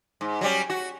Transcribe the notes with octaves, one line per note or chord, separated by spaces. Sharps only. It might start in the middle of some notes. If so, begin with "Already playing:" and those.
G#2
F#3 G3 C#4
F#4